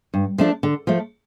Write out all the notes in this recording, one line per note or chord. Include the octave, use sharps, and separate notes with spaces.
G2
F3 A3 D4
D3
F3 A3